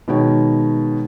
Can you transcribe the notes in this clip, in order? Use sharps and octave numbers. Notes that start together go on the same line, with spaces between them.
B2 D#3 G#3 C#5